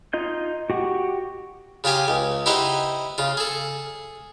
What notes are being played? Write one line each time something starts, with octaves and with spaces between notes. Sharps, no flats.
D#4 F4 D#5 G6
F#4 G4 F#5 C#6
C#3 F4 G4 G#5 D6
C#2
D#4 E4 G4 C5 D#5 F#5
C#3 F4
G#4 A4